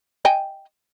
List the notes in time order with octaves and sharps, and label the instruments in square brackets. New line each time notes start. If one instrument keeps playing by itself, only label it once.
[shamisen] D#5 G5 G#5